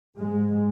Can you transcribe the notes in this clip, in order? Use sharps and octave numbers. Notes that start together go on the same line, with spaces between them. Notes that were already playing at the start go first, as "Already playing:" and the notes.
G#2 G#3